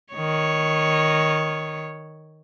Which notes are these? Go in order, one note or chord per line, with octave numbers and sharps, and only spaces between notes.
D#3 C#5